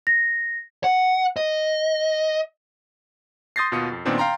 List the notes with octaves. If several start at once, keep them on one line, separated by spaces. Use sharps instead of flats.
A#6
F#5
D#5
C6 D#6 G6 A6 A#6 C7
D#2 B2 F4 D#6 C#7
F2
A#2 D#3 B3 C4 D4
F5 G5 A#5 C6